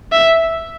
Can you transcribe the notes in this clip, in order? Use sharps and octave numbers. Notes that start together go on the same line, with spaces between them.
E5